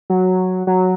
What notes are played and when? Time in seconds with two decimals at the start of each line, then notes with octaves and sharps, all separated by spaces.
0.10 F#3
0.67 F#3